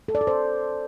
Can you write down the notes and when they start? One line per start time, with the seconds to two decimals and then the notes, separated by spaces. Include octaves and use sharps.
0.08 A4
0.15 D5
0.21 A4
0.27 C5